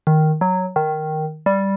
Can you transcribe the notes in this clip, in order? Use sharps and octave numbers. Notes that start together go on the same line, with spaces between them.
D#3
F#3
D#3
G3